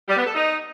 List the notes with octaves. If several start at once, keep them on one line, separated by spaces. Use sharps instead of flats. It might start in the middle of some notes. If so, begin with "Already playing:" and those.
G3
B3
A4
D#4